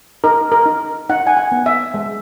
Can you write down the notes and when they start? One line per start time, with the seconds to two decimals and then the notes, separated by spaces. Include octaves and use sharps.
0.24 D#4 A#4
0.52 A#4
0.66 D#4
1.09 D#4 F#5
1.27 G#5
1.37 F#5
1.52 B3
1.66 E5
1.94 G#3